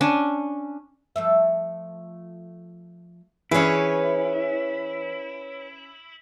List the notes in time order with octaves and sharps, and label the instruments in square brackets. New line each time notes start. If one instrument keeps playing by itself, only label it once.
[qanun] C#4 D4
[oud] F3 A3 E5
[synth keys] E3 [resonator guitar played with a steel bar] C#4 G#4 [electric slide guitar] E4 [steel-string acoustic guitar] B4 C#5